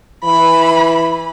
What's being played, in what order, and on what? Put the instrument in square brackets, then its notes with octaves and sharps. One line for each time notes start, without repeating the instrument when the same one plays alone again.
[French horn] E3 [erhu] B5